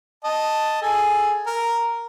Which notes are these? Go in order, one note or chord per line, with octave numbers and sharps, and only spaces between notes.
D#5 A5
G#4 A4
A#4